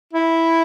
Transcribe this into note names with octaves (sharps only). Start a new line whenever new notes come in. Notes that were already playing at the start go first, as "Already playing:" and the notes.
E4